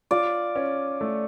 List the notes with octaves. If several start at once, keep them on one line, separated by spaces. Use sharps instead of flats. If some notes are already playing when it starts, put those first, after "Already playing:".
F4 D5
C#4
A3